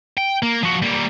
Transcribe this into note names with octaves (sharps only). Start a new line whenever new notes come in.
G5
A#3
F3 F#4
G3 A#3